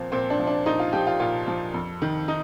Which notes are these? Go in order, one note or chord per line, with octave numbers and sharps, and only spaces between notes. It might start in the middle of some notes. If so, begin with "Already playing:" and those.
Already playing: A#2 F3 C4
A#2 C4
D4
F3
D4
A#2 D#4
F4
F3 G4
F4
A#2 F4
F3
F2
D#3
D#4